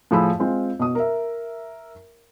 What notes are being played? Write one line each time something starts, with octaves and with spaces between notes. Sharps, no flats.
A2 F3 G#4 B5 E6
G#3 C4 F4
B2 D#6
A#4 E5